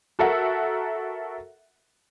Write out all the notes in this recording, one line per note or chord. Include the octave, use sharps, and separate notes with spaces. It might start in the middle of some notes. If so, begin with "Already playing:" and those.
F#4 A4 A#4 E5 F#5